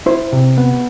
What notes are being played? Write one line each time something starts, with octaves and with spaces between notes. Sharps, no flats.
E4 C5
C3
B3